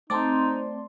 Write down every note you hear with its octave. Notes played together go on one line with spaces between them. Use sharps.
A3 C4 D#4 D5 A5 C6